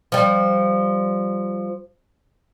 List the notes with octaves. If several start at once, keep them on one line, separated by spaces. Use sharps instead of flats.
F3 G3